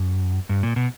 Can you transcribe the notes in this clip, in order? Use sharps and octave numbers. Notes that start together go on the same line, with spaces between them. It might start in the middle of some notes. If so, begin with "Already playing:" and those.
Already playing: F#2
G2
A#2
B2